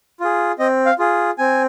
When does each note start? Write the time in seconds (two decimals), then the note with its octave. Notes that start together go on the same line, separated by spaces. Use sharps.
0.20 F4 G#4
0.59 C4 D#5
0.86 F5
0.99 F4 G#4
1.38 C4 G#5